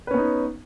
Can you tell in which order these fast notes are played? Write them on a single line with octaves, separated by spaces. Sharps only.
B4 C#4 B3 D#4